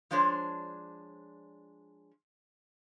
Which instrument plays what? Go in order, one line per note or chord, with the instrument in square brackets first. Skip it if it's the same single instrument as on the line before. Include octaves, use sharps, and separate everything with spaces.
[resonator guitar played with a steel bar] F3 G#3 D4 C5 C#5